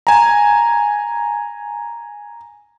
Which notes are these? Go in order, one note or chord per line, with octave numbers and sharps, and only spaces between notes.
G#5 A#5